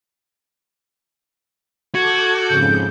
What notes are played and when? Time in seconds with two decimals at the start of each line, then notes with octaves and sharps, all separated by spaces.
1.95 F#4 A4 D6 G6 G#6
2.49 F2 G#2 C#3 G6